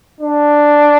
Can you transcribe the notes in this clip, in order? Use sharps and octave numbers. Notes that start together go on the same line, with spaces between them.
D4